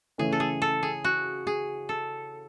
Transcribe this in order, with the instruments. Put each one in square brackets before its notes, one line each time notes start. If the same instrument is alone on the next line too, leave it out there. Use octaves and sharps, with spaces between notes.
[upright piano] C#3 E3 A3 C#4 [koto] G#4
[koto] A4
G#4
A4
G#4
F#4
G#4
A4